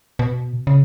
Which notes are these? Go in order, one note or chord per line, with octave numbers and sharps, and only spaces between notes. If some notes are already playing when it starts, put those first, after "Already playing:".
B2
C#3